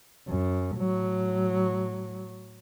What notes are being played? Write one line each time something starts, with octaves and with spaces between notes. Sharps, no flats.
F#2
A2 F#3